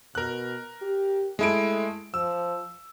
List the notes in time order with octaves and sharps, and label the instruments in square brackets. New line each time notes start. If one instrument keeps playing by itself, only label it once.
[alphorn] B2 [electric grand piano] A#4 F#6
[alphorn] G4
[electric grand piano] G#3 E4 D7 [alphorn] A3
[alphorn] F3 [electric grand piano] E6